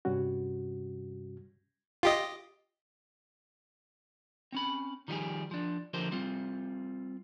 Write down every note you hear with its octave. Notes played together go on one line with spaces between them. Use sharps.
G2 C3 G3 C#4 F#4
F4 G4 D#5
C4 C#4 B5
D#3 F3 G3 F4 G4 G#4
F3 D4
D3 F3 G4 A#4 C5
G3 C4 F4